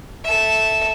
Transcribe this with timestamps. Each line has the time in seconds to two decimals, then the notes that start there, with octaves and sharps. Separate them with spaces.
0.25 A4 E5